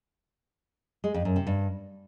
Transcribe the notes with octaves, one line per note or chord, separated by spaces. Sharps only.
G#3
F2
F#2
C3
G2